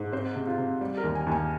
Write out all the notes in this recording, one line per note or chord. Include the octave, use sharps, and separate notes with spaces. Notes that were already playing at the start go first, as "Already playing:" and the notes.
Already playing: G#2
C4 C5
C3
F4
C3
G3
A#4
D#2
G#5
D#2
G#5